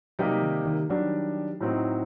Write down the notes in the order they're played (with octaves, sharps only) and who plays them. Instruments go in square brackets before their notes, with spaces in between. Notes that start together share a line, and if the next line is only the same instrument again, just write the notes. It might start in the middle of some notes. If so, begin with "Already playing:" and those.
[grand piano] C3 G3 A#3 D#4 G4 [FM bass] F#3
[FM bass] D#3
D#3
[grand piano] D#3 G3 D4 [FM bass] F#3
[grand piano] A2 F#3 C4 D#4